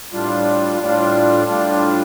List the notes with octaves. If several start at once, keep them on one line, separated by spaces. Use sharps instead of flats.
A2 G3 D4 F4
A2 G3 D4 F4
A2 G3 D4 F4